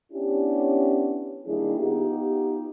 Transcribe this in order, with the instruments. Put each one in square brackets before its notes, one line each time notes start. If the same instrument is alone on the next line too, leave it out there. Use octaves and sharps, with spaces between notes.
[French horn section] B3 C#4 D4 E4 G4
D#3 G3 A#3 D4 E4 G#4
B3 D#4 F4 G4